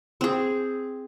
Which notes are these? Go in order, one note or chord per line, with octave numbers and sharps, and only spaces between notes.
C4 G#4